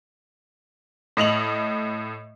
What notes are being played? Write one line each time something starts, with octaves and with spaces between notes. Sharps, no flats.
A2 D#5 F7 F#7